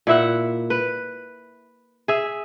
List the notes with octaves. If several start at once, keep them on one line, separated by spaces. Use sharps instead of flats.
A#2 E4 E5 F#5
B4
G#4 E5